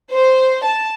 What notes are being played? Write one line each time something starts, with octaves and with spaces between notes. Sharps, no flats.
C5
A5